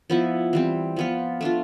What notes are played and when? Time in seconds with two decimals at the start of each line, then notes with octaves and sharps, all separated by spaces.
0.10 F3 B3 E4
0.53 E3 G3 C4
0.96 F3 B3 F4
1.41 A3 D4 F4